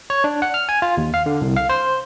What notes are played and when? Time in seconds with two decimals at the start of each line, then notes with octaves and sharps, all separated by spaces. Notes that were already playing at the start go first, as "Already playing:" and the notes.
0.10 C#5
0.24 D4
0.42 F#5
0.54 F6
0.69 G#5
0.82 F4
0.97 D#2
1.14 F5
1.26 D3
1.42 C2
1.57 F5
1.69 C5